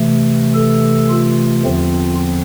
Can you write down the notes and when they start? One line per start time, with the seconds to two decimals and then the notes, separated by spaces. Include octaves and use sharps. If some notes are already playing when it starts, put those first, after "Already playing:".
Already playing: C3 E3 A3
0.54 A4
1.09 F4
1.63 E2 D3 F3 C4